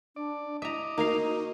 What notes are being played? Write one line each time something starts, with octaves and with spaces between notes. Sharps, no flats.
D4 D5
E4 D#5 E5 A#5 D6
A#3 D#4 F#4 A#4 F5